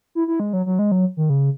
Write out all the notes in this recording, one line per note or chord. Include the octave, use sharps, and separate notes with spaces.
E4
E4
G#3
F#3
F#3
G#3
F#3
D#3
C#3